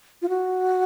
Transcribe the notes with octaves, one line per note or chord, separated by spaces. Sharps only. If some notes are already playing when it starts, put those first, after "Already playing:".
F4
F#4